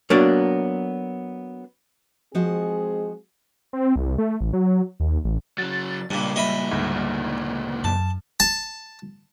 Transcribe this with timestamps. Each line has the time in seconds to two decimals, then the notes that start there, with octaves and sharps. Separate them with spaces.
0.10 F#3 A#3 B3 D4 D5
2.35 F3 G#3 C4 F#4 G#4 D#5
3.73 C4
3.96 C2
4.18 A3
4.41 A1
4.53 F#3
5.00 D#2
5.24 A1
5.58 C#3 F#3 A6
6.11 C#2 G2 A#2 G3
6.36 C#2 A#2 D#5 E5 B5
6.71 D2 G#2
7.84 F#2 A5
8.40 A5